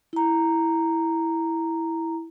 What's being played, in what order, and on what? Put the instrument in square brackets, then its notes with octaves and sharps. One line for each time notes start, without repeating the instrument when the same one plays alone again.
[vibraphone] E4 A#5